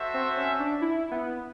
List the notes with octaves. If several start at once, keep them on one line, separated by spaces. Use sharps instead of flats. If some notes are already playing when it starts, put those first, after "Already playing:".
Already playing: F#4 A4 C5 E5
C4
C#4
D4
E4
B3